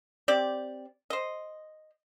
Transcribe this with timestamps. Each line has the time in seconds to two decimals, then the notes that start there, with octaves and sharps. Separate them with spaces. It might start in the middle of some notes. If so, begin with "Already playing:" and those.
0.28 C4 G4 D5
1.10 C5 D#5